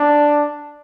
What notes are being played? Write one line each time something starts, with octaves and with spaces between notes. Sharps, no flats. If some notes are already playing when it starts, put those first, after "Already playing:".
Already playing: D4